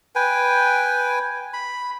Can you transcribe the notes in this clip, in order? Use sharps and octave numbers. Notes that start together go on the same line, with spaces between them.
B4 G5 G#5
B5